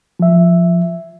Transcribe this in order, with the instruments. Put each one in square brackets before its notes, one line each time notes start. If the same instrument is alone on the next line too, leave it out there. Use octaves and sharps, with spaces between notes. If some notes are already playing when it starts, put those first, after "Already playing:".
[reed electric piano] F3 E5